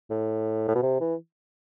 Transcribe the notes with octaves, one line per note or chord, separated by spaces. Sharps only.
A2
A2
B2
C3
E3